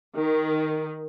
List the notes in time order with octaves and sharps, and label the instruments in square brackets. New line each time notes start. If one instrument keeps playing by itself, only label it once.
[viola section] D#3